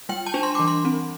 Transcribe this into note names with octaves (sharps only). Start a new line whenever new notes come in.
G3 G5
A5
D4
C6
E3 D6
C6
C4